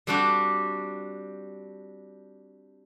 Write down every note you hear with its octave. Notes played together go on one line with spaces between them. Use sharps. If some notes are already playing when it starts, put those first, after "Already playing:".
G3 C4 D4 F#4 G4